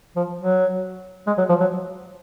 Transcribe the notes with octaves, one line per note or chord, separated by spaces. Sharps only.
F3
F#3
G#3
F#3
F3
F#3